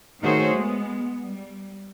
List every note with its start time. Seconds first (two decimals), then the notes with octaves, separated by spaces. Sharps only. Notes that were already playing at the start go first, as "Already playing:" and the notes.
0.21 D#3 A3 F#4 G#4 C5 C#5
0.54 G#3 B3
1.21 G3